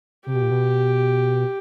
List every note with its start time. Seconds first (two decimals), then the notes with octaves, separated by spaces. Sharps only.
0.26 C3 G4
0.34 B2
0.42 A#2
0.51 B2